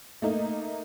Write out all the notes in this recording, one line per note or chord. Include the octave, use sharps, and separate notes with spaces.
A3 A#3 D#4